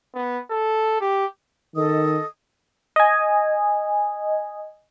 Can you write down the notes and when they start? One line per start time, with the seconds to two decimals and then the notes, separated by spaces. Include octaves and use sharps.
0.15 B3
0.50 A4
1.01 G4
1.76 D#3 A4 D#5 D#6
2.96 D#5 G#5